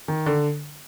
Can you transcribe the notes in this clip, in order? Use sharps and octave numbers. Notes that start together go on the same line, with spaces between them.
D#3
D3